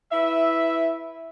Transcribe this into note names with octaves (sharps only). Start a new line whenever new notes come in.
E4 B4 E5